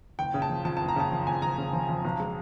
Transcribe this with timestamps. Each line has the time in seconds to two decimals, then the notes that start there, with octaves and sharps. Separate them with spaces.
0.19 F#1 G5
0.34 C#3
0.42 A5
0.50 F3
0.65 F2 A5
0.77 F#1 A5
0.88 A#5
0.96 C#3 A5
1.11 F3
1.27 F2 G#5
1.42 F#1 A#5
1.58 C#3
1.73 F3
1.89 F2
2.05 B1
2.20 G#3